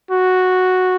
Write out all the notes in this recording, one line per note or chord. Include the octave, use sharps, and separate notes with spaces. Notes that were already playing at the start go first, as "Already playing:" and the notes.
F#4